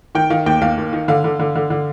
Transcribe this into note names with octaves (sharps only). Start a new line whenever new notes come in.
D#3 G5
D#3 F5
D#2 G5
D#2 F5
D#2
D#3
D3 F5
D3
D3
D3
D3